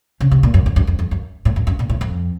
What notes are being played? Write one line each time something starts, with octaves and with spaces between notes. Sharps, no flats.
C#3
C3
A#2
F#2
F2
F#2
F2
F2
F#2
A2
F#2
F#2
A#2
A2
F2